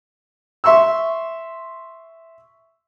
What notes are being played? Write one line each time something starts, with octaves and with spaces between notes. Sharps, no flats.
E5 C6 C#6 E6